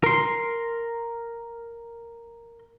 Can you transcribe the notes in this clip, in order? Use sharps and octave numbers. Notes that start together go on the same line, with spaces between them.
A#4 C6